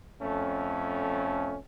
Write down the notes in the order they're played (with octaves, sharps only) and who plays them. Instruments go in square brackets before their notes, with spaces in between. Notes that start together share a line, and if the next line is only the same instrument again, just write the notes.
[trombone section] F2 A3 C#4